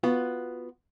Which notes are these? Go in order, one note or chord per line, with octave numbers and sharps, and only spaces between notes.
B3 F4 F#4